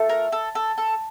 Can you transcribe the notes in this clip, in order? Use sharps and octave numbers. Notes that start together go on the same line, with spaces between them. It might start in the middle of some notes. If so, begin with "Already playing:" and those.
Already playing: A3 F4 A4
A#4
A4
A4
A4